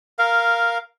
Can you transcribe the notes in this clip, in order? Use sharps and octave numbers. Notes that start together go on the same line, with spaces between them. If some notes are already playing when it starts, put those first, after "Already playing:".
A#4 F5